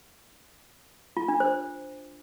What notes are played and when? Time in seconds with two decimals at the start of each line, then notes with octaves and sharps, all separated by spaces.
1.17 F4
1.28 D4
1.40 C5